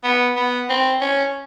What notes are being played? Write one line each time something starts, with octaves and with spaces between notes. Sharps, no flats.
B3
B3
C4
C#4